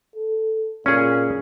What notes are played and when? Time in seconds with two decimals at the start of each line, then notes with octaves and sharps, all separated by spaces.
0.15 A4
0.86 A#2 C#4 G#4